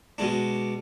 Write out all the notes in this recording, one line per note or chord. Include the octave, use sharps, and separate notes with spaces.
B2 G#3 D4